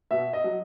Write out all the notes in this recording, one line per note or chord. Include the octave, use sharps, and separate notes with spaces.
B2 E5
D#5
F#3